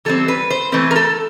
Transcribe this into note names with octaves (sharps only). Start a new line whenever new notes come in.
E3 G3 C4 A4
B4
C5
E3 A3 C4 B4
A#4
A4